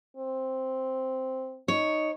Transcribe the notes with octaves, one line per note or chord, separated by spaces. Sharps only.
C4
D#4 C#5